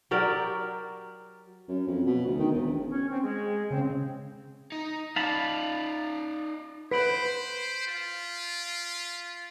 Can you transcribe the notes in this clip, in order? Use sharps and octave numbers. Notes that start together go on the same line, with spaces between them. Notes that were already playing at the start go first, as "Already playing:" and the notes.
F#3 G4 A#4 D5
F#2
F2
B2
D2
D#3
E1
C#4
C4
G#3
C#3 C4
D#4
D#4 D5 F5 A5 B5
B4 C5 B6 D7 F#7
F4